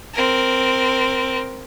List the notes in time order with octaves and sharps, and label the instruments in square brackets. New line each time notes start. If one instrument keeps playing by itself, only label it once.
[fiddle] C4 A#4